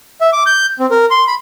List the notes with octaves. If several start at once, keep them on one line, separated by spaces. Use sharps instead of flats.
E5
D6
G6
C4
A#4
C6
B5